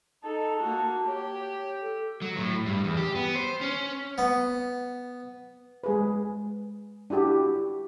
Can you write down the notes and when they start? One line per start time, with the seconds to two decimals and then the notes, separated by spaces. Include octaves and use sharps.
0.23 D#4 A4 A5
0.60 A#3 F#4
1.07 G4 C#5
1.81 A4
2.22 F#3
2.37 A2
2.66 G2
2.84 E2
2.97 G4
3.15 B3
3.35 C5
3.61 C#4
4.18 B3
5.84 G#3 G#4 B4
7.10 D4 E4 F#4 G4